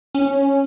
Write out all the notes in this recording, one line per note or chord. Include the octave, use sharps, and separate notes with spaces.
C#4